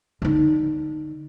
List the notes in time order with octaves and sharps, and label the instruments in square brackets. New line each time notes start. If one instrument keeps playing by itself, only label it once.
[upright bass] D3 D#4